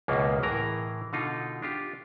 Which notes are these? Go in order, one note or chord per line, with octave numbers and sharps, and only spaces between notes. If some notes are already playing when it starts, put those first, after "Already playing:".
C#2 F#2 B2 A#3
A2 E3 G#4 A#4 A#5
B2 D3 D#4 F4
D4 F4 G4